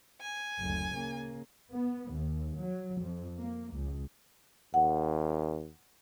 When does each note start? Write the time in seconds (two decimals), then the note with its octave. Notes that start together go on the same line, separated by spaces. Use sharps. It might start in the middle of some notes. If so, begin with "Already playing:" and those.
0.21 G#5
0.60 F#1 D2
0.94 C#3 A#3
1.72 B3
2.13 D#2
2.58 F#3
3.01 F2
3.39 A#3
3.75 C#2
4.74 D#2 F#5